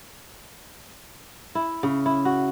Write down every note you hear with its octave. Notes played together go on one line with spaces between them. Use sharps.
E4
C#3
E4
F#4